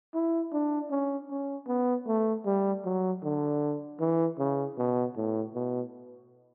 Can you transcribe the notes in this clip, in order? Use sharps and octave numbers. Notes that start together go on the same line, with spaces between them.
E4
D4
C#4
C#4
B3
A3
G3
F#3
D3
E3
C#3
B2
A2
B2